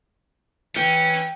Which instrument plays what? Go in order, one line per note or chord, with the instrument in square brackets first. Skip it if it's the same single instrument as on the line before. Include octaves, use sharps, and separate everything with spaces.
[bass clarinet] E3 [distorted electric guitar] C#4 [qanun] G5